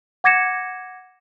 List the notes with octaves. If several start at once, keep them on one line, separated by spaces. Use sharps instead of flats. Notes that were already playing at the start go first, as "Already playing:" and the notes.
F#5 D6 G#6 A#6 C#7 E7